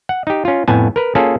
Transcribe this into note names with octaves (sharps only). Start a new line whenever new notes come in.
F#5
D#4 G4
C#4 F4
F2 A2 B3 G#5 A5
A#4 B4
A#3 C#4 F4 G#4 A4